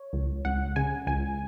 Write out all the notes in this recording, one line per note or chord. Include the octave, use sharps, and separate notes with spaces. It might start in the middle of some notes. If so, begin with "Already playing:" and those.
Already playing: C#5
C#2
C#2 F#5
C#3 G#5
C#2 G#5